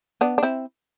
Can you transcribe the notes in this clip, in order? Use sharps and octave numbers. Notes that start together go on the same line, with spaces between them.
B3 D4
D4
C4 E4